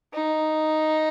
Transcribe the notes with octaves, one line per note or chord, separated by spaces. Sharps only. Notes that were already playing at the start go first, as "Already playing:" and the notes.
D#4